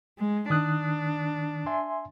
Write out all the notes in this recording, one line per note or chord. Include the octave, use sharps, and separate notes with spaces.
G#3
D#3 D4 D#6 F#6
E5 G#5 C6